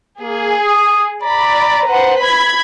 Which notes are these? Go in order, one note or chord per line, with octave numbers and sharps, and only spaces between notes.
A#3 G#4
D#6
D5 A#5 B5
B4 C5 F#5
B5 G#6